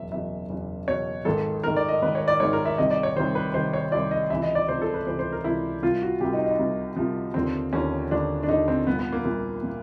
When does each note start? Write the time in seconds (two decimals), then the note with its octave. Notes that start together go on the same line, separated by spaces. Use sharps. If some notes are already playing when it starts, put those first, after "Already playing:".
Already playing: F#1 E2 B2 E5
0.11 F#1 E2 B2 E5
0.49 F#1 E2 B2
0.88 F#1 E2 B2 C#5
1.25 G#1 G#2 D#3 A4
1.63 G#1 G#2 D#3 A#4
1.77 D5
1.89 D#5
2.02 G#1 G#2 D#3 B4
2.15 C#5
2.28 D5
2.40 G#1 G#2 D#3 C#5
2.53 A#4
2.65 E5
2.78 C2 C3 D#3 D#5
2.91 D5
3.03 C#5
3.16 C2 C3 D#3 C5
3.35 B4
3.54 C2 C3 D#3 C5
3.73 C#5
3.92 C2 C3 D#3 D5
4.11 D#5
4.30 C#2 C3 E3 E5
4.43 D#5
4.55 D5
4.68 C#2 C3 E3 C5
4.82 A4
4.94 B4
5.07 C#2 C3 E3 C5
5.19 C5
5.32 A#4
5.44 C#2 C3 E3 E4
5.82 C2 C3 F3 F4
6.02 F#4
6.21 C2 C3 F3 G4
6.33 D#4
6.46 D#4
6.58 C2 C3 F3
6.96 C2 C3 F3
7.34 D#2 D3 F3 C4
7.73 D#2 D3 F3 C#4
8.11 D#2 D3 F3 D4
8.43 D4
8.48 D#2 D3 F3 D#4
8.68 C4
8.86 C2 A#2 F3 B3
8.99 B3
9.12 A#3
9.25 C2 A#2 F3 B3
9.63 A#2 F3